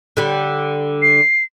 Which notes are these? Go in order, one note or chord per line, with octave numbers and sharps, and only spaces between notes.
D3 G3
C7